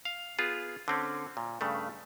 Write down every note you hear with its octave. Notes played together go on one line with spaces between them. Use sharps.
F5
B3 F4 G#4
D3 C4 C#4
A#2
G2 C#3 A3